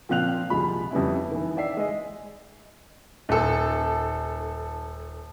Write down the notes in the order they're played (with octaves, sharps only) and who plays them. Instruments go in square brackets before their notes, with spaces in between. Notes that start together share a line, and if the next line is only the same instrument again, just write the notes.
[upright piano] A#2 F3 C4 F5 F#6 F7
C2 F3 G#3 F4 B5
F2 G3 B3 C#4 E4
D#3 E3
D5 E5 C7
G#3 D#5
D#1 A4